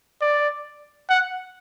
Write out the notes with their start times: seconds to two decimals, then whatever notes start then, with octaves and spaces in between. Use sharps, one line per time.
0.21 D5
1.09 F#5